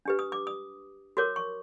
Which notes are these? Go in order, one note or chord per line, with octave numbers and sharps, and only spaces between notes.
D4 G4 B4
D#6
D6
D#6
F#4 A#4 C#5 D6
C#6